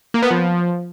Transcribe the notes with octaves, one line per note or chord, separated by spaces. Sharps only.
A#3
B3
F3